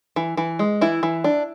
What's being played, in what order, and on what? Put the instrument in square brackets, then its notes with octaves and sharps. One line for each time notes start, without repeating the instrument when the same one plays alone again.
[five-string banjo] E3
E3
G#3
E3 E4
E3
D4